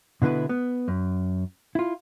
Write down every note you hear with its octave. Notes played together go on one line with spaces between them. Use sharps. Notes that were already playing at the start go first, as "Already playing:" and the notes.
B2 D3 B3 E4 B4
B3
F#2
E4 F4